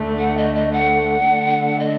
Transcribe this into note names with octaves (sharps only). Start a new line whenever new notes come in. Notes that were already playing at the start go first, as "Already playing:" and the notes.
Already playing: D2 D3 A3
F#5
D#5
D#5
F#5
D3 A3 D4
D#5